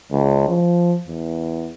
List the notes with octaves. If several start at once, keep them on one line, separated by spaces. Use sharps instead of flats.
C#2
F3
E2